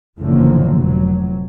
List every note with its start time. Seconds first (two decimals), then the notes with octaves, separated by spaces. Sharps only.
0.18 F#1 E2 A2 D3 F3 A#3
0.75 F1 F#3